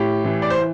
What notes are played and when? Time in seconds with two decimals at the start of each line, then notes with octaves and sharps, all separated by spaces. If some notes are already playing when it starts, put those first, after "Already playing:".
Already playing: A2 G4
0.25 E3
0.42 D5
0.50 C5